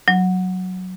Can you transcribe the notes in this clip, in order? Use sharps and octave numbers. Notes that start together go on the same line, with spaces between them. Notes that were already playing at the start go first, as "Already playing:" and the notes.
F#3